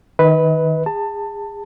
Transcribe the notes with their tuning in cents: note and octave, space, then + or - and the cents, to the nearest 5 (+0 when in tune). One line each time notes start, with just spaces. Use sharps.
D#3 +0 B4 +0 D#5 +40
G#4 -30 A5 +20